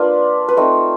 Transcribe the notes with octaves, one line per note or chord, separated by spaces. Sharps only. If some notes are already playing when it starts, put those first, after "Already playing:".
Already playing: A#3 D4 F4 B4
B4
A3 C4 D#4 C5